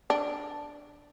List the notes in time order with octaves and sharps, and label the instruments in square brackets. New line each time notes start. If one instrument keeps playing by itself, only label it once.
[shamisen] D4